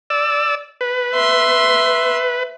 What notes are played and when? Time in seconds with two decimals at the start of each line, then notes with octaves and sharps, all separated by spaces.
0.10 D5 E6
0.81 B4
1.14 E5 C6